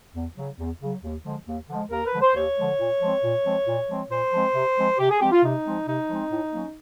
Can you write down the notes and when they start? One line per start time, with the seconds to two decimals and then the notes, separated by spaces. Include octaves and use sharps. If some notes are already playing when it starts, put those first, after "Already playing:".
0.15 E2
0.38 C#3 F#3
0.59 E2
0.82 C#3 F#3
1.04 D#2
1.25 D3 F3 G#3
1.47 D#2
1.70 D3 F3 G#3
1.91 D#2 A#4
2.05 B4
2.13 D3 F3 G#3
2.21 C5
2.35 D#2 C#5
2.58 D3 F3 G#3
2.79 A#2
3.01 F3 G#3 C4
3.24 A#2
3.45 F3 G#3 C4
3.67 A#2
3.89 F3 G#3 C4
4.10 A#2 C5
4.32 F3 G#3 C4
4.55 C3
4.77 F3 G#3 C4
4.99 C3 G4
5.10 G#4
5.20 F3 G#3 C4 G4
5.32 F4
5.43 C3 D#4
5.64 F3 G#3 C4
5.87 C3 D#4
6.08 F3 G#3 C4
6.31 A2
6.53 F#3 A#3 C#4